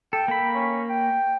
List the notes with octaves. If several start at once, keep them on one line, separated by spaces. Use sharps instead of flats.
A4 G5
A#3 B5
C#4
G5